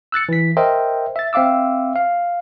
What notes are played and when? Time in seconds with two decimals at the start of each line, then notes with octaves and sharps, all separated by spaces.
0.12 E6 F#6 A6 C#7
0.29 E3 B6
0.57 A#4 C5 D#5 E5 G5
1.16 E5 A6
1.33 C4 E5 F5 D6 E6
1.96 F5